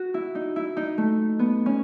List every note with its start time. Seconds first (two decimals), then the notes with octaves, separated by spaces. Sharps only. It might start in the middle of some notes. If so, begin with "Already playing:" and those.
Already playing: F#4
0.14 E4
0.35 D#4
0.56 E4
0.77 D#4
0.98 A3
1.39 B3
1.66 C#4